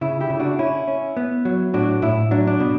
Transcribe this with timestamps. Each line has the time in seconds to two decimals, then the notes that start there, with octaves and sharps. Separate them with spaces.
0.01 C#3 E4
0.21 E4 G4
0.30 C#3
0.40 D4 F#4
0.59 C#4 E4
0.88 C#4
1.17 B3
1.45 F#3
1.74 A2 D4 F#4
2.02 A2 E4
2.31 F#3 D4
2.47 D4
2.60 B2